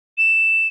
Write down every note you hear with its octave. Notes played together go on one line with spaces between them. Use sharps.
E7